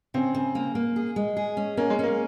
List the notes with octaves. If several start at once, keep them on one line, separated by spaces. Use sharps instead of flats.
C#3 C4
C#3
A#3
A#3
G#4
G#3
G#4
C#4
A#3 C#4
G#3
A#3 C#4